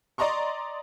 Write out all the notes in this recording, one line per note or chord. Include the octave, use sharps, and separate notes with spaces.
D5 D#5 A#5 C6 C#6